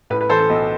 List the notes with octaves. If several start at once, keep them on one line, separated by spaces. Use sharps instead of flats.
A2 B4
B4
E3 A4 C5
A4
B1